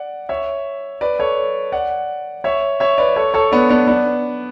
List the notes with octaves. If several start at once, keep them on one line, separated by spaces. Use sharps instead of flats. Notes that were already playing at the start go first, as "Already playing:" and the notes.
Already playing: D5 F#5
C#5 E5
B4 D5
A4 C#5
D5 F#5
C#5 E5
C#5 E5
B4 D5
A4 C#5
A4 C#5
B3 D4
B3 D4
B3 D4